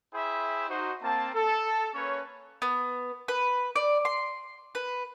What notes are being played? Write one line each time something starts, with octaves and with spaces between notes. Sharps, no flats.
E4 G#4 C5 E5 G5 B5
D#4 F#4 C5
A#3 C4 A5
A4
A#3 C#4 B4 C#5
B3
B4
D5
C6
B4